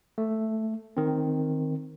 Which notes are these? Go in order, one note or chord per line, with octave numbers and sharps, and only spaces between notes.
A3
D#3 C4